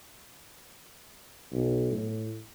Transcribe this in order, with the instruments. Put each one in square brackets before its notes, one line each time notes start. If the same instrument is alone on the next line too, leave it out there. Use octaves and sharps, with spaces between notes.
[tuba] B1
A2